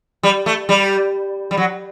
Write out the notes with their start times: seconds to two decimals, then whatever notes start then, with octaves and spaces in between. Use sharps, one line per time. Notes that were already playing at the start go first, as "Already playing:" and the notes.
0.23 G3
0.46 A3
0.69 G3
1.51 G3
1.57 F#3